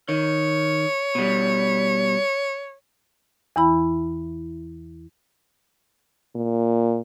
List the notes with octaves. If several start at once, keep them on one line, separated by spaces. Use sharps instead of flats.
D#3 C#5
B2 G3
E2 E3 E4 B5
A#2